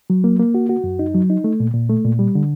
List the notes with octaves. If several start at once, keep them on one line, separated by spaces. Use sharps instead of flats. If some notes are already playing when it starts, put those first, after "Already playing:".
F#3
A#3
A#3
F#4
F#4
F#2
D#4
F#3
D#4
A3
A#2
A#2
A3
A#2
G3
D3